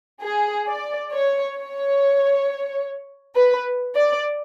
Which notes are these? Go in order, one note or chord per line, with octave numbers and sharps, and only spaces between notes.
G#4
D5
C#5
C#5
B4
D5